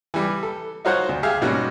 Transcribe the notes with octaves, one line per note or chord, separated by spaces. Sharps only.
E3 G3
A4
D#4 F4 F#4 C5 C#5 F#5
D2
G4 G#4 E5 F5
G#2 B2 G3 A#3 C#4 F#4